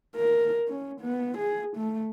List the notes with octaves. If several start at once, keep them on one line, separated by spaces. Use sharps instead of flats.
A#4
C#4
B3
G#4
A3